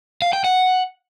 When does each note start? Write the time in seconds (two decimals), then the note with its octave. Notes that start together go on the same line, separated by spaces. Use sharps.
0.22 F5
0.33 G5
0.44 F#5